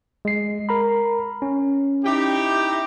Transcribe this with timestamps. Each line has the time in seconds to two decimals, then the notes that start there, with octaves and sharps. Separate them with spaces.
0.25 G#3 C7
0.69 A#4 A#5 B5
1.42 C#4
2.04 D#4 E4 G4